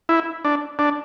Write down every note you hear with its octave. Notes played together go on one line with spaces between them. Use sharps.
E4
D4
D4